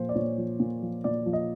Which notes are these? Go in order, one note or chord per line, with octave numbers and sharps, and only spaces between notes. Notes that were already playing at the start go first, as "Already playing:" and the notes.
Already playing: A#2 F3 C5
D5
A#2 C#5
F3
A#2
F3
A#2 D5
F3
D#5